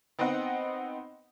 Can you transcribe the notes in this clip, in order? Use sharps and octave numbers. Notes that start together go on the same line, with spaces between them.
B3 C4 D#4 D#5 F#5